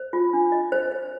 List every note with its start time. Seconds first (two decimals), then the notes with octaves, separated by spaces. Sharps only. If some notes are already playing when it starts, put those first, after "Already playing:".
Already playing: C5
0.13 F4
0.33 D4
0.52 D#5
0.72 C5
0.92 C5